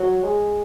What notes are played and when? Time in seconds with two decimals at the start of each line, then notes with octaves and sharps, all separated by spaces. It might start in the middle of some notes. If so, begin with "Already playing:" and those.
Already playing: F#3
0.23 G#3